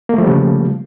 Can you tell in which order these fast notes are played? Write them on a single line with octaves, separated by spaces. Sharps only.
A#3 A3 F3 G3 C#3